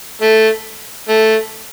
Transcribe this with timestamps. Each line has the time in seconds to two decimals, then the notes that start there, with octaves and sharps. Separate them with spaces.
0.21 A3
1.09 A3